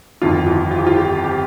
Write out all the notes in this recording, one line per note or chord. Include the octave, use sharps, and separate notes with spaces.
G1 F2 D#3 F4
F4
F4
G4
F4
G4
G4